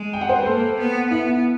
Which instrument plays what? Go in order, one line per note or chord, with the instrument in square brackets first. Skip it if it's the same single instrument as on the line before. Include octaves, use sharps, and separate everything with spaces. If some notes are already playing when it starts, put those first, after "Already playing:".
Already playing: [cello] G#3
[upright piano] G5
F#5
C5
B4
[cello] A#3 [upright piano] A4
[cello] B3
[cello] B3 [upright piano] E4